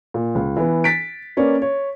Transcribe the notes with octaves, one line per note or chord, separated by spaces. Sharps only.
A#2
C#2
E3 B3
A6 B6 D7
A#3 C#4 B4 D5
C#5